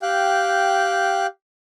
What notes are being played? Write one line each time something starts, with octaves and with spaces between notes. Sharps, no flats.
G4 F5 G5 F#6